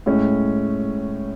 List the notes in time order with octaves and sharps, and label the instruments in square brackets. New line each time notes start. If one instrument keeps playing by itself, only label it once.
[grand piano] A2 G#3 C#4